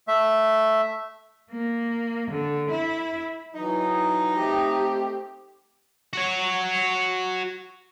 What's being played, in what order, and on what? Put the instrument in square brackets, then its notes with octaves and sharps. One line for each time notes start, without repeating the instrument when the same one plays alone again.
[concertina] A3 E5
[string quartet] A#3
D3
E4
[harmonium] E3 F#3 [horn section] D#4
[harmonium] A3 C4 [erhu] G4
[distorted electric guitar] F#4 C#5